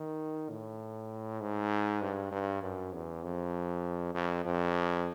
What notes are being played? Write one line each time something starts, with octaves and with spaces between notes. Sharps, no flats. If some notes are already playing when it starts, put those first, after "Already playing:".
Already playing: D#3
A2
G#2
G2
G2
F#2
E2
F2
F2
F2